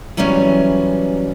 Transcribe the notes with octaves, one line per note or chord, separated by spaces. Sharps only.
E3 F#3 G3 B3 C#4